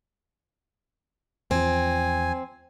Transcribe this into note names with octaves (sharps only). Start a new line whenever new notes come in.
E2 F3 C4 G#5